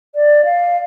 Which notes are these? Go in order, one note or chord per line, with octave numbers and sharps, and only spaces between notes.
D5
F5